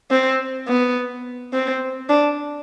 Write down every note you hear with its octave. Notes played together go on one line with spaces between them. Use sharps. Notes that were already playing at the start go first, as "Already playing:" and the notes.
C4
B3
C4
D4